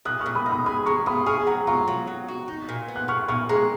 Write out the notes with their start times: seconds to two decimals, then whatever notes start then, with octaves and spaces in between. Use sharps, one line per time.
0.05 A#2 D#6 F#6
0.21 C#6 F6
0.26 A#2
0.35 B5 D#6
0.46 D#4
0.51 B5 D#6
0.66 G#4 B5 D#6
0.86 G#3 A#5 C#6
1.06 F4 B5 D#6
1.26 G#4 C#6 F6
1.47 F#3 F#5 A#5
1.67 F4 A#5 C#6
1.87 F#3
2.07 F#3
2.28 F#4
2.48 D#4
2.69 A#2
2.88 B3
2.96 F#6
3.08 A#2 C#6 F6
3.28 A#2 C#6 F6
3.49 G#3 A#5 C#6